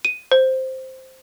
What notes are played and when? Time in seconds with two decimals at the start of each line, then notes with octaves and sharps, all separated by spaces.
0.05 D#7
0.32 C5